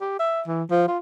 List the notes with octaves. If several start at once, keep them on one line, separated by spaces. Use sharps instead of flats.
G4
E5
E3
F3
F4